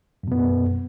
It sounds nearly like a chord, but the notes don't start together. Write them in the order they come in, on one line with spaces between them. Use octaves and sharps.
F#2 B2 B3